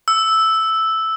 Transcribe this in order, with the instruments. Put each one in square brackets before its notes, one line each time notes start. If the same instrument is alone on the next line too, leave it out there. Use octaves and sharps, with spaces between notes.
[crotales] E6